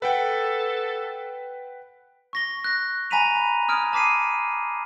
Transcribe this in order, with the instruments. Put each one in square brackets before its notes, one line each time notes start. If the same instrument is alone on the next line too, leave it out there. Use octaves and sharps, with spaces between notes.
[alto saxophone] A4 [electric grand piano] B4 F#5 G5
[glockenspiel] C#6 A#6 G7
F#6 A#6
G#5 A#5 B5 B6 D#7 F7
B5 D#6 F6 G#6 D7
A5 D6 B6 C7 D#7